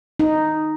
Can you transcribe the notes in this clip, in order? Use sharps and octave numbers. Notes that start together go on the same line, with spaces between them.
D#4